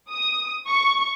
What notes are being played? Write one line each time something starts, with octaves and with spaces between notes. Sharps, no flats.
D#6
C#6